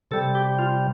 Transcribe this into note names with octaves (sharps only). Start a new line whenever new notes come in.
C3 G3 A4
G4
F4